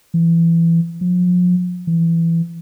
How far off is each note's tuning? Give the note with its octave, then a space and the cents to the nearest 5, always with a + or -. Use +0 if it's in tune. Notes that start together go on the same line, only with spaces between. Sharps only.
E3 +20
F3 +40
E3 +15